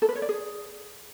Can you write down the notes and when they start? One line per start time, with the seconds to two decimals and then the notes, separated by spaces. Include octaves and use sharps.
0.02 A4
0.09 B4
0.15 C#5
0.22 D5
0.29 G#4